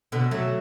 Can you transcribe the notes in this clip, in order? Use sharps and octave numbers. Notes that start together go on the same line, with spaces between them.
B2 D3
F#3 A3